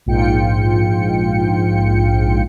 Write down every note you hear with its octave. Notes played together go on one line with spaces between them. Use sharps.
A#1 G#2 F4 G5 C#7